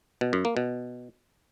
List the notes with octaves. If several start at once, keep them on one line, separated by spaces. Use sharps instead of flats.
B2
F#2
A#3
B2